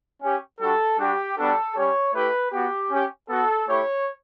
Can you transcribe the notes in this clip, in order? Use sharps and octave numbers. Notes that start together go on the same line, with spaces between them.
C#4 G4
G3 D4 F#4 A4
G3 D4 F#4 G4
G3 B3 D4 F#4 A4
G3 C#4 G4 C#5
A3 E4 G4 B4
B3 F#4 G4
C#4 G4
B3 F#4 A4
A3 E4 G4 C#5